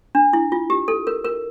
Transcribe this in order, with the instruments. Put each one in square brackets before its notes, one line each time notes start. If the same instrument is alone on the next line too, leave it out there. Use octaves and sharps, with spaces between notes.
[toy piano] D4
E4
F4
G4
A4
A#4
A#4